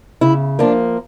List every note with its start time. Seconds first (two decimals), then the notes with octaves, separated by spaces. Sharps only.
0.21 C#3 E4
0.59 F3 A#3 D4